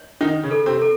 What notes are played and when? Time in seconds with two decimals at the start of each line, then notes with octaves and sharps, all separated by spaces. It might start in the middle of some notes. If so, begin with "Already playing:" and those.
Already playing: C#5
0.21 D#3 D#4 F#5
0.43 C#3 C#4
0.51 A4
0.66 C3 C4
0.82 A4